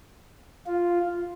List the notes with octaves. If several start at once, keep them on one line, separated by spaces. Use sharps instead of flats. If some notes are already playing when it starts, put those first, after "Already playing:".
F4